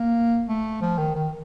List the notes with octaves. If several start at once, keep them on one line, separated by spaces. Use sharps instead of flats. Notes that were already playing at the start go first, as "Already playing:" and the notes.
Already playing: A#3
A3
F3
D#3
D#3